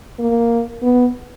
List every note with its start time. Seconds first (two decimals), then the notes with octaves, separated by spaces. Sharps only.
0.19 A#3
0.83 B3